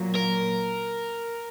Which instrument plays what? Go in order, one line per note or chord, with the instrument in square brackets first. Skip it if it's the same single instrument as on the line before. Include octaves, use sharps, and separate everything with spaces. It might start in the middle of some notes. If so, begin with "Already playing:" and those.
Already playing: [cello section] A#2 F#3 A#3
[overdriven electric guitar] A#4